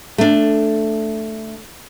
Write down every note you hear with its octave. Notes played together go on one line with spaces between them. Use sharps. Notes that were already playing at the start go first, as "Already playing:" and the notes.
A3 D4